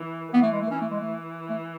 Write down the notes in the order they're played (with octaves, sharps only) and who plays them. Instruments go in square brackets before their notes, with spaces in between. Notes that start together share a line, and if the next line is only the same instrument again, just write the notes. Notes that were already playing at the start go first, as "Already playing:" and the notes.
Already playing: [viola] E3
[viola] E3 [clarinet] B3
[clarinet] A3
G#3
A3
[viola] E3 [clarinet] C#4
[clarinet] A3
G#3
A3
A3